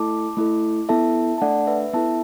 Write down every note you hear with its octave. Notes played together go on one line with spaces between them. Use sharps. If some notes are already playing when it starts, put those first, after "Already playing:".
Already playing: A3 E4 A4 A5 D6
A3 E4 A4
B3 E4 A4 E5 A5
A5
A3 D4 A4 D5 F#5
B4 E5
B3 E4 A4 E5 A5